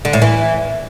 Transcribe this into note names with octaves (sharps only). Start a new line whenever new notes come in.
D3
A2
E3